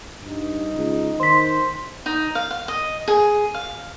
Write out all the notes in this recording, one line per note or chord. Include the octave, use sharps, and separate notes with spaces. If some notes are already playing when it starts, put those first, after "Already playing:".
G2 D#4
C#2
D#3 C5 C6 B6
D#4
F5
F5
D#5
G#4
F5